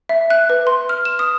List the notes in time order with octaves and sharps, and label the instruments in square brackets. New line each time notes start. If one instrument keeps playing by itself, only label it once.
[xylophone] E5
F#6
B4
C6
F6
E7
D#6